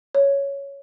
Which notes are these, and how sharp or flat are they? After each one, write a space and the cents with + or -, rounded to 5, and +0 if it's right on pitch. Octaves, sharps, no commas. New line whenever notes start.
C#5 +5